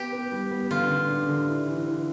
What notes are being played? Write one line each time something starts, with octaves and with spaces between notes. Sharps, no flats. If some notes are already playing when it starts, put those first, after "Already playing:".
Already playing: B3 G4
B3
G3
B3
D3 F4
D3
D4
D3
E4
E3
E3